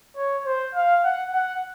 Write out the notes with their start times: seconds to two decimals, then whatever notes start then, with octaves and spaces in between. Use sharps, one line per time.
0.17 C#5
0.46 C5
0.75 F5
1.04 F#5
1.33 F#5